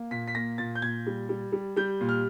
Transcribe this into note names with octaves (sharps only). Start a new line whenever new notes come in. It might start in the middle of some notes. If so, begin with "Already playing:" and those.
Already playing: A#3
A#2 B6
B6
A#3 A#6
A#2 A6
G6
A#2 G#6
G3
G3
G3
G3 G6
A#2
F6